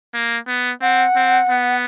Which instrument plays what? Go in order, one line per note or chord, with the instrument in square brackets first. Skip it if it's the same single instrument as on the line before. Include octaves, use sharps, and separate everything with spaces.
[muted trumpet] A#3
B3
[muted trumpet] C4 [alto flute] F#5
[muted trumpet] C4
B3